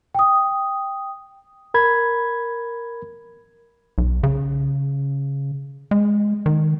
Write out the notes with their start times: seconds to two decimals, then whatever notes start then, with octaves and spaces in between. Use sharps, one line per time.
0.15 G5 D#6
1.74 A#4 B5 G#6
3.98 B1
4.23 C#3
5.91 G#3
6.46 D#3